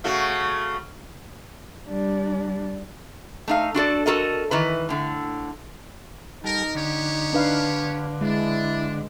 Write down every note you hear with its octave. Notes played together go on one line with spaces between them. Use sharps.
C#3 A3 F#4
G3 D4
A3 D#4 F5
D4 F#4 A4 D5
F#4 A4 A#4 D#5
D#3 E3 B4
A2 D3
G3 D#4 A4 A#4
D3 B3 G4 C#5
D4 B4 F5
G#3 D4 E4